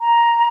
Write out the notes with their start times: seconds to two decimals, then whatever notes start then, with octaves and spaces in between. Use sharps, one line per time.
0.01 A#5